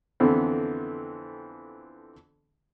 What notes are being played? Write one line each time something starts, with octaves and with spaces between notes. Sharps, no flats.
F2 D3 E3 B3 C4